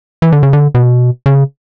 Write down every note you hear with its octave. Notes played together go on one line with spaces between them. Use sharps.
E3
D3
C#3
D3
B2
C#3